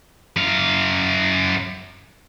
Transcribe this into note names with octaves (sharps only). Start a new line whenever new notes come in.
F#2 F5